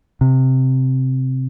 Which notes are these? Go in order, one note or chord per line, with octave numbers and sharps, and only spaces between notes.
C3